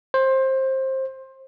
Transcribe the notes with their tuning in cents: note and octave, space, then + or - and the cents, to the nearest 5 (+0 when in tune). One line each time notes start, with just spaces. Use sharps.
C5 +20